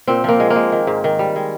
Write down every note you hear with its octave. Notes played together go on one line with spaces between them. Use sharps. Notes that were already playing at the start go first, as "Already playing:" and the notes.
A#2 C4
F3 A#3
G#3
A#3
G#3
D#3
G#2
D#3
G3
G#3